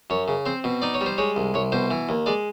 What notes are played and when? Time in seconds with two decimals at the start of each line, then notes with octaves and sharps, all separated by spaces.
0.10 F#2 C#5
0.28 C#3
0.46 C4 C5
0.64 B2
0.82 D#4 D5
0.94 C#5
1.01 G3
1.06 C5
1.18 G#3 C#5
1.36 C2
1.54 C2 C#5
1.72 B2 C5
1.91 E3
2.09 D#2
2.26 G#3 D5